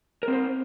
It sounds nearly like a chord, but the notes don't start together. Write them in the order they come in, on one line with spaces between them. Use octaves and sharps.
A#4 C4 C5